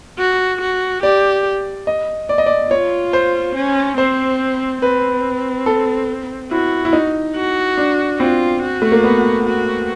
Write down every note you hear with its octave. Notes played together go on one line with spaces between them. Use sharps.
F#4
F#4
G4 D5
D#5
D5
D#5
D5
F4 C#5
C5
C#4
C4 C5
C4 B4
A4
E4 F#4
E4
D#4
F#4
D4
C4 F4
F#4
A3
A#3
B3
F#4